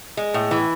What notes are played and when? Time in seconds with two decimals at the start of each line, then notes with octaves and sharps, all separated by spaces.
0.17 G#3
0.34 A2
0.51 E3